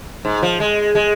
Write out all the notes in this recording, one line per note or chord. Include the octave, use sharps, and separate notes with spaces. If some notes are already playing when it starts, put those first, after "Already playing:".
G#2
F3
G#3
G#3